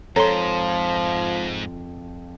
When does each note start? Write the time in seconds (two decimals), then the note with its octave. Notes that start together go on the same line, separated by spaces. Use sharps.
0.16 F2 G#2 F3 A4 C#5 A#5 C6